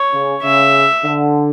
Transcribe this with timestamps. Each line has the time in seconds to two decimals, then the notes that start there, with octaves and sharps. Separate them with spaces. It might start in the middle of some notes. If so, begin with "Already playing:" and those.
Already playing: C#5
0.13 C#3
0.43 C#3 E5
1.04 D3